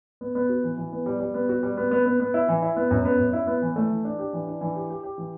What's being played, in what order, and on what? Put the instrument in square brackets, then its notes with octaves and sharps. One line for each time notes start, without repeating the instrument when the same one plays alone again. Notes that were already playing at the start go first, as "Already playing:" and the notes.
[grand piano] B3
B3
F#4
E3
E3
B3
G3
G3
B3
F#4
G3
B3
B3
B3
B3
E4
E3
E4
B3
F#2
B3
F#2
E4
B3
E3
A3
E3
D4
G4
E3
D4
E3
G4
G4
G4
E3